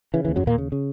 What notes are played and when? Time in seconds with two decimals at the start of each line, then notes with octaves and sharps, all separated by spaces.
0.14 C#3 E3
0.25 E3
0.28 D#2
0.36 F#2 F#3
0.44 D#2 A#2 A#3
0.58 C#3
0.72 C#3